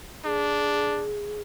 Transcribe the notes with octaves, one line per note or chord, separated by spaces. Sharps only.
D4 G#4